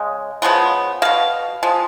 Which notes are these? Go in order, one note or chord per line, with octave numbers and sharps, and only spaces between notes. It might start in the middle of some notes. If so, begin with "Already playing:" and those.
Already playing: C#3 G#3
C#3 F3 G#3 B3
B2 A#3 F5
F3 G#3